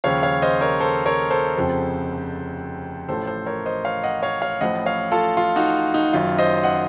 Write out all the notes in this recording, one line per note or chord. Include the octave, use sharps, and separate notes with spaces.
D#2 C#3 F3 C#5 F5
C#5 F5
C5 D#5
A#4 C#5
A4 C5
A#4 C#5
A4 C5
F1 F2 C#3 F3
A1 A2 F3 A4 C5
A4 C5
A#4 C#5
C5 D#5
C#5 F5
D#5 F#5
C#5 F5
C#5 F5
A1 A2 F3 D#5 F#5
C#5 F5
F4 A4
F4
D#4 F#4
D#4
F#1 F#2 D#3 F4
C5 D#5
D#5 F#5